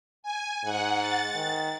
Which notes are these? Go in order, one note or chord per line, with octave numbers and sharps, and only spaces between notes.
G#5
G#2 F#5
A6
D#3